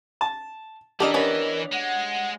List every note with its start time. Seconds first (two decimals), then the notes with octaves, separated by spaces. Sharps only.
0.21 A5
1.00 E3 D4 G4 A4 A#4 D#5
1.14 B3 C#4 A#4 B4 D#5
1.72 G#3 F#5